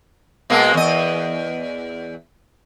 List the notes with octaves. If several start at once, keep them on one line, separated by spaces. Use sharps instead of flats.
B2 G#3 A#3
E2 D#5